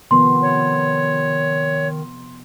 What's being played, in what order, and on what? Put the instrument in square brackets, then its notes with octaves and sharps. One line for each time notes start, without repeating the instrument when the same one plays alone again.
[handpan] C3 F3 B3 [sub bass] D#3 [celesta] C6
[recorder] C#5